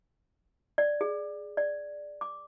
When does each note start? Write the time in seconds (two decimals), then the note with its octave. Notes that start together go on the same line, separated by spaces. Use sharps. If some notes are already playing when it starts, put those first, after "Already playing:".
0.78 D5
1.01 G#4
1.57 D5
2.21 D6